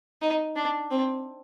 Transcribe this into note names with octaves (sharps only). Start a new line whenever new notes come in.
D#4
D4
C4